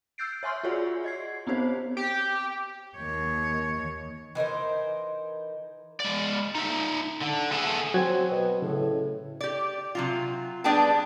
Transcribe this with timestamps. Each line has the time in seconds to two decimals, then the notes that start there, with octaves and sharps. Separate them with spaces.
0.18 E6 F#6 G6 A6 C7 D7
0.43 C#5 E5 G#5 C6 C#6 F6
0.63 F4 F#4 G#4 C#5 D5 F#5
1.04 D#5 G#6 C7
1.47 B3 C4 D#4 G4 C5 C#5
1.97 G4
2.97 D#2 C#5
4.35 E3 D#4 A#4 C5
6.00 G#3 D5
6.55 D#4 E5
7.21 D3
7.53 G#4 A4 E5 G#5
7.94 F#3 C4 F#4 G#6
8.31 B2
8.62 A2 C#3
9.41 G4 D5
9.95 C3 F#3 F4
10.64 G3 B3 D4 G#4 G5 A5